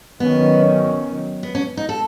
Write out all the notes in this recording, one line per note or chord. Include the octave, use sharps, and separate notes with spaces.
D#3 F#3 B3 C#4
B3
C#4
D#4
A4